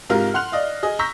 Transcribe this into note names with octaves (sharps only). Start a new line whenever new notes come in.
G#2 C3 F4 A#4 F6
F#5 C6 F#6 F7
D5 D#5 F5
G#4 D#5
A#5 C#6 E6 G6 A#6 B6